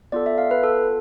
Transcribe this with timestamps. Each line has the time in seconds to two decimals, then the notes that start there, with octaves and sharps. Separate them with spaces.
0.12 B3 F4 A4 D5
0.26 E5
0.38 F5
0.51 B4
0.63 A4